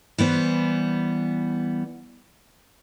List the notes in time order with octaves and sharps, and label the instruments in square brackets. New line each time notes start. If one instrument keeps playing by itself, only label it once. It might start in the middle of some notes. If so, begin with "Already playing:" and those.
[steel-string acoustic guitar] E3 G3 B3 C5